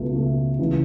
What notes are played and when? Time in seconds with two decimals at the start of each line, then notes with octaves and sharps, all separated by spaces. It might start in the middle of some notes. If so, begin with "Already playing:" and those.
Already playing: C#2 B2 A3
0.12 C#2 B2 A3
0.59 C#2 C#3 E3 A3